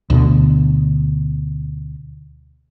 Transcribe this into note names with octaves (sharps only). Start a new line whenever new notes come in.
D2 B2 D3